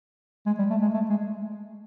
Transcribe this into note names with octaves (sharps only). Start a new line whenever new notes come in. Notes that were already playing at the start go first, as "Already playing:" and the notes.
G#3
G3
A3
G#3
A3
G#3